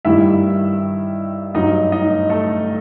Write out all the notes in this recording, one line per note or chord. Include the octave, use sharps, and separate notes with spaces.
G2 D#3 G3 E4 E5
G2 F#3 D#4 D#5
D#4 D#5
A3 A4